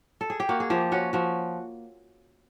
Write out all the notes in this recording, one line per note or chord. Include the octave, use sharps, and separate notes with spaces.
A4
G#4
G4
A#3 F#4
G#4
F3 G4
C#4 F#4
F3 F#4